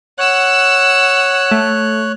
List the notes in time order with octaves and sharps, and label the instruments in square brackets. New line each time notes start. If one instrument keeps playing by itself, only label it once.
[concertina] C#5 F#6 [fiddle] F#5 E6
[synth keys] A3